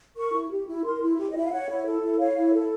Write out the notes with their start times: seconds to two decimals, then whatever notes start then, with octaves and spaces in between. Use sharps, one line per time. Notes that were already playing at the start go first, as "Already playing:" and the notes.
0.16 A#4 C#6
0.33 E4
0.50 G4
0.67 E4
0.84 A#4 C6
1.01 E4
1.18 G4
1.30 D#5
1.35 E4 E5
1.45 F5
1.51 C#5 F#5
1.69 E4
1.86 A4
2.02 E4
2.19 C#5 F5
2.36 E4
2.53 A4